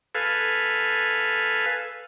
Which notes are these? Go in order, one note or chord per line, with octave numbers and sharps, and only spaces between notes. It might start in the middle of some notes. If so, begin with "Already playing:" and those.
A4 B4 F5 G#5